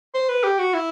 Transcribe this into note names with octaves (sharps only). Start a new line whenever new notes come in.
C5
B4
G4
F#4
E4